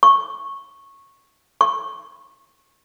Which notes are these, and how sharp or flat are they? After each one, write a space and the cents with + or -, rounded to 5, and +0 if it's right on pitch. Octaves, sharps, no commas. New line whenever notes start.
C#6 -15
C#6 -30